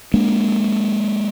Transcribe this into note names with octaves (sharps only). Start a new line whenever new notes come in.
G#3 A#3 D4